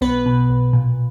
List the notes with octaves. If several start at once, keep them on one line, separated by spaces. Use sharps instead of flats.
B1 B3 B4
B2
B1
A#2